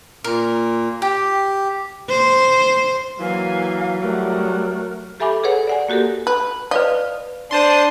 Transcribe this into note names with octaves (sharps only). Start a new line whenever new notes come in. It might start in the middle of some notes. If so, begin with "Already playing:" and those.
A#2 A#4
G4 G5
C5
E3 F#3 A#3 F5 G#5
G3 A3 A#4 F#5
G4 A4 E5 G#5 B5 D6
G#4 A4 B4 C#5 F#5
D5 F#5 G#5
A#3 F#4 G4 A4 A#4
B4
B4 D5 D#5 F5
D4 C5 A5 C6 D#6